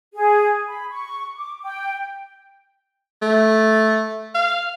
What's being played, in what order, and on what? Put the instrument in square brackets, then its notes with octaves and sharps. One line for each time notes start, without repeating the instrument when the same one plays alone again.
[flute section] G#4
B5
C#6
D6
G5
[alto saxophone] A3
F5